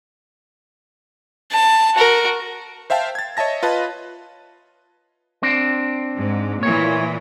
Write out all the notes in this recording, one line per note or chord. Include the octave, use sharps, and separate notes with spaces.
A5
F#4 A#4
C5 E5 F5 G5 A5
G#6 A6
C#5 D#5 E5 A5 A#6
F4 B4 D#5 A5
C4 D4
G#2
A#2 E3 C#5